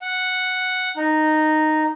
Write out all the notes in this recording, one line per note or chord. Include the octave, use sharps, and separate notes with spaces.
F#5
D#4